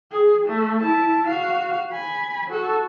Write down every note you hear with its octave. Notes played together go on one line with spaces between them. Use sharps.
G#4
A3
E4 A5
F#4 F5
G#5 B5
F#4 A4